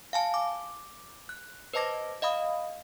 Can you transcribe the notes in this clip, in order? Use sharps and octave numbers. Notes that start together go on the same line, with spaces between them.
F5 G#5 A5
D6
F#6
B4 C5 D#5 A5 D6 A#6
D#5 F5 B5 D#6